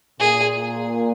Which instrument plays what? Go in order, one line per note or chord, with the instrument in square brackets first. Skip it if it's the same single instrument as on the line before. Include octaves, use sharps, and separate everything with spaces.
[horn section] A#2 [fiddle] G#4